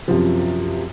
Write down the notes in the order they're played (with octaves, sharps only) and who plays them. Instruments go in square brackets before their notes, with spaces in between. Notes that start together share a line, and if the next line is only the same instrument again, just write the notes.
[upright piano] F#2 C3 F3